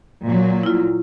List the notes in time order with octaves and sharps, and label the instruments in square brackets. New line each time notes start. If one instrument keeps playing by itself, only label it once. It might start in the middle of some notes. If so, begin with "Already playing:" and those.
[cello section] A#2 F#3
[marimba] E4 F4